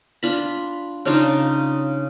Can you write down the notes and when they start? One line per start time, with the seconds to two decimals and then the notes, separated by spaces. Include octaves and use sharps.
0.23 D4 F4 B5
1.05 C#3 D4 D#4 F4